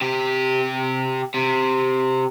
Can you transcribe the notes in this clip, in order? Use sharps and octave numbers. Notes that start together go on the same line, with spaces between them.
C3 G4
C3